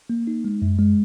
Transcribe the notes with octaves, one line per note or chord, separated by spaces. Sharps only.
A#3
D#4
G#3
F#2
G#3